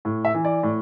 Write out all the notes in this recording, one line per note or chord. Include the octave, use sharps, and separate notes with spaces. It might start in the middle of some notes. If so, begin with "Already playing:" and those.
A2
E5
E3
D5
A2